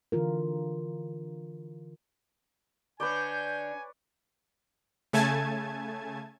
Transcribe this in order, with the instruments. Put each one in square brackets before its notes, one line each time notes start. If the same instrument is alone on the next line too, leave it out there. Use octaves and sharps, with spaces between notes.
[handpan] D3 E3 F4 A#4
[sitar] D3 D4 [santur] B4 C#5 D5 [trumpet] G#5 [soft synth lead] G6
[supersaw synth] C#3 A3 G#5 A5 G#6